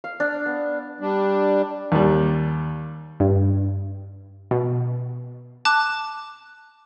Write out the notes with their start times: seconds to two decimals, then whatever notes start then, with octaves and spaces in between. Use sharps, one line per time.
0.04 F5
0.20 D4
0.46 B3
1.00 G3 D4
1.92 D#2 G3
3.20 G2
4.51 B2
5.65 A5 D6 F#6